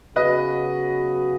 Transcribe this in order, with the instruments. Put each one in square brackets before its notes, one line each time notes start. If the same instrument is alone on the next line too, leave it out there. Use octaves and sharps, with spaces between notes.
[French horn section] C#3 F#3 B3 F#4 [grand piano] B4 D#5